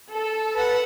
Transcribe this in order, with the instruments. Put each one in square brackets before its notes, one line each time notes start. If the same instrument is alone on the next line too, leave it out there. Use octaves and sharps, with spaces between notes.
[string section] A4
[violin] B4 F#5